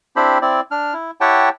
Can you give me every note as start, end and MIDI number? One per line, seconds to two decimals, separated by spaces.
0.16 0.38 60
0.16 0.38 62
0.16 0.38 64
0.16 0.38 67
0.16 0.38 72
0.16 0.38 83
0.42 0.60 60
0.42 0.60 64
0.42 0.60 74
0.71 0.93 62
0.71 0.93 89
0.94 1.11 64
1.21 1.49 64
1.21 1.49 67
1.21 1.49 73
1.21 1.49 78
1.21 1.49 79
1.21 1.49 81